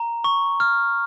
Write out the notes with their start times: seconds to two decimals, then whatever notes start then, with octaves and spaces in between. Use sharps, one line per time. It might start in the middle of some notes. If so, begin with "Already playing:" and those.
Already playing: A#5
0.24 C#6
0.60 F6